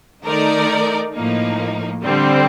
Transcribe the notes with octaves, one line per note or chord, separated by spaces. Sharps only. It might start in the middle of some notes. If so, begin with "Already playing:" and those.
D#3 A3 D#4 A#4 D5
A2 F3 A#3 D#4
D3 G3 C4